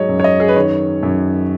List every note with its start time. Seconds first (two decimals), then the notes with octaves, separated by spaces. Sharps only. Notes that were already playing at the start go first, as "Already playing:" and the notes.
Already playing: G#2 F#3 G#4 C#5 D#5
0.09 F#2
0.20 C#5
0.24 D#5
0.40 G#4
0.48 B4
0.56 D#3 C#5
1.03 F#2